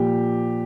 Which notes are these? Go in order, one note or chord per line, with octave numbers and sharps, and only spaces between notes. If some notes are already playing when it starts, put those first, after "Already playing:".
Already playing: A#2 F3 G4